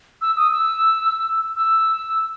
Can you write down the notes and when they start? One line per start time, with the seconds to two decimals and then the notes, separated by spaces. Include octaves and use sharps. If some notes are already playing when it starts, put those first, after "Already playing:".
0.22 E6
0.37 D#6
0.52 E6
1.56 E6